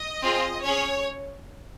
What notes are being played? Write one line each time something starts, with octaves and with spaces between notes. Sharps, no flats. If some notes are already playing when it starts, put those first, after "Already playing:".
Already playing: D#5
C4 F4 G#4
C#4 G#4 C#5